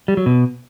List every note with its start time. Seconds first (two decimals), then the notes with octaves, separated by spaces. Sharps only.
0.08 G3
0.17 F#3
0.26 B2